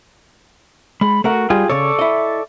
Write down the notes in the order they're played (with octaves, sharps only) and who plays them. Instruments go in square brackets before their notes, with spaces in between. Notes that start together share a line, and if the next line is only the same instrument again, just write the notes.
[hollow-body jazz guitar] G#3 [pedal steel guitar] B5
[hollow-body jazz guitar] A3 A#4 F#5 [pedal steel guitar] F#4
[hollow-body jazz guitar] G3 [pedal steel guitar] F4 G4 G#4
[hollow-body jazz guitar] C#3 C#5 [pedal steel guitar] A4 D5 C#6
[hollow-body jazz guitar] E4 D#5